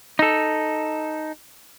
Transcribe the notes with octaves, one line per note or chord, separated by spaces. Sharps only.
D#4 A4